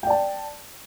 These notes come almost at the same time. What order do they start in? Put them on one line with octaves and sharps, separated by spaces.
G5 D5 A5